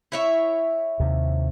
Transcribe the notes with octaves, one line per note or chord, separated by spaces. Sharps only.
E4 C#5 E5
D#2 C3